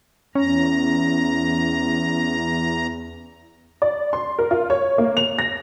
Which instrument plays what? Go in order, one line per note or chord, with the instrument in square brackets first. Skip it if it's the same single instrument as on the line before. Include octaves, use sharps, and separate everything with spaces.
[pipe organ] E2 A#5 [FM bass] C#4
[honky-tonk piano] D5
C6
A#4
F4
C#5
A#3
F7
A#6